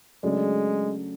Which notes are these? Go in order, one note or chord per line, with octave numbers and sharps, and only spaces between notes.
C#3 F#3 G#3 A3 D4